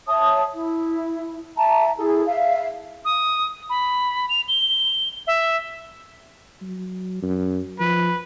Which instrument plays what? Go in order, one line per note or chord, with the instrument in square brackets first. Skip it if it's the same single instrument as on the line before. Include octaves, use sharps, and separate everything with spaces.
[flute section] C#5 E5 A5 D#6
E4
E5 A5 A#5
E4 G#4 A4
E5 F5
[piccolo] D#6
B5
F7
G7
E5
[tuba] F#3
F#2
[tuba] F3 [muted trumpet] B4